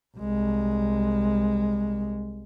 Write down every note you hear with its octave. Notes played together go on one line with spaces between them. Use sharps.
C2 G#3